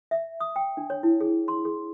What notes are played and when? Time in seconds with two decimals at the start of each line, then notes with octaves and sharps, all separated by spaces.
0.11 E5
0.40 D#6
0.56 G5
0.77 D4
0.90 C#5
1.03 E4
1.21 G#4
1.48 C6
1.65 G#4